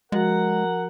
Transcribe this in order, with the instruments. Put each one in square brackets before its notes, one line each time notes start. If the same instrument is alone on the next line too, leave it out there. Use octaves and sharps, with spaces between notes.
[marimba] F3 F#4 A#6 [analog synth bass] G#3 [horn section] A#4 F#5